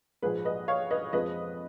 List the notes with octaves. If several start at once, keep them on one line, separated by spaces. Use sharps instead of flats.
A#1 G#2 F3 G#4 B4
B4 D#5
C#5 F5
B4 D#5
F2 F3 G#3 B4 D#5